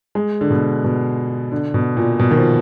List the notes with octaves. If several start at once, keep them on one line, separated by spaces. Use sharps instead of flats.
G#3
D3
B2
B2
D3
B2
A#2
B2
D#3
F3